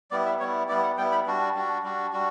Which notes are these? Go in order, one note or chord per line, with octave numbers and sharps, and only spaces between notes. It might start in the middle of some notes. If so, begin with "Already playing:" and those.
G3 B3 E4 D5
E5
G3 B3 E4 C#5
G3 B3 E4 D5
F#5
G3 B3 E4 G5
B5
G3 D4 F#4
G3 D4 F#4
G3 D4 F#4
G3 D4 F#4